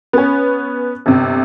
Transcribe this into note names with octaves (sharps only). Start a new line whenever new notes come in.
B3 C#4
G1 C3